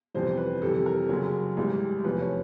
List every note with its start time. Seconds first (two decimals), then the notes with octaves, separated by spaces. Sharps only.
0.14 G1 F2 C3 E3 G3 C5
0.37 B4
0.62 F2 C3 E3 G3 A4
0.86 A#4
1.09 F#1 F#2 C#3 F#3
1.57 A1 G#2 E3 G3
2.04 F1 E2 C3 F3 B4
2.21 C#5